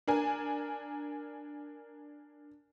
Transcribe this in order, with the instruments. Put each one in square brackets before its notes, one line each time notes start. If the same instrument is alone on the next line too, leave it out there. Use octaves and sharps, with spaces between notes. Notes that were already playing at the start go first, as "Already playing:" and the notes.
[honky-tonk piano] D4 A#4 G#5